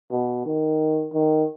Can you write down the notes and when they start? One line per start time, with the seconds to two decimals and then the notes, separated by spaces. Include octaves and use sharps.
0.11 B2
0.46 D#3
1.13 D#3